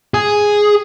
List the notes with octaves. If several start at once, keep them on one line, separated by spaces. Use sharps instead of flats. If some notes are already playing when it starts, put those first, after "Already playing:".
G#4